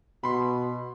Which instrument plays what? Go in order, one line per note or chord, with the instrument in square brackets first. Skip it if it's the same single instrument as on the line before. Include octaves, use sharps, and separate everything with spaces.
[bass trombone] B2 [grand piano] B5 C6